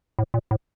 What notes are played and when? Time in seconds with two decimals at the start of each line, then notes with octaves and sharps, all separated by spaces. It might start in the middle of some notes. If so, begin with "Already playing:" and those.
0.19 A2
0.34 A#2
0.51 A2